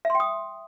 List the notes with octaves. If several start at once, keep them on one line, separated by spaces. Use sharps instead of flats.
E5
C6
G5
D#6